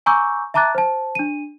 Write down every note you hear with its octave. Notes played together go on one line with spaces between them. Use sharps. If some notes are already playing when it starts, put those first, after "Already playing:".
G#5 A#5 C#6 D6 E6 G6
E5 A5 A#5 D6 F#6 A6
C5 A5
D4 D#7